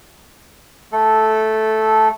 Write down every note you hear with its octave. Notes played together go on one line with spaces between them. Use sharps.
A3 A4